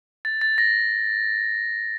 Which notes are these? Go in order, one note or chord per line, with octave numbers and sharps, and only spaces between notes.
A6
A6
A#6